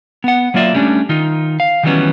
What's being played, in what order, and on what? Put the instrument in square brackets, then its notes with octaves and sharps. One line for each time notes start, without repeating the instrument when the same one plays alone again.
[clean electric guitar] B3 F#5
F#3 A#3 F4 D5 E5
G3 A3 C#4 D4
D#3 D#4 F4
F5
D#3 E3 F#3 G3 B3 C#4